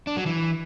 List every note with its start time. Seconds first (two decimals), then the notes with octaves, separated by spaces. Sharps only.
0.07 D4
0.17 F#3
0.26 E3